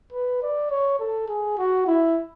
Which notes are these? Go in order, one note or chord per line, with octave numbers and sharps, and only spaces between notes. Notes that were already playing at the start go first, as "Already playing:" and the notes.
B4
D5
C#5
A4
G#4
F#4
E4